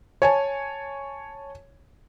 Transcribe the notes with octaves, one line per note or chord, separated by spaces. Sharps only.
C#5 G#5 A5